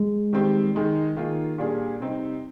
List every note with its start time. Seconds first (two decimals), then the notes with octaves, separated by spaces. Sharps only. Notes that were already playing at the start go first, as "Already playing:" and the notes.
Already playing: G#3
0.33 D#3 G3 C4 G4
0.75 D#3 G#3 D#4
1.16 D#3 A#3 F4 G#4
1.58 A#2 G3 D4 G#4
2.00 C3 G3 C4 D#4